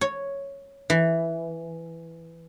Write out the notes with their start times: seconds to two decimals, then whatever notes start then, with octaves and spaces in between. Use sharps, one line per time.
0.01 C#5
0.90 E3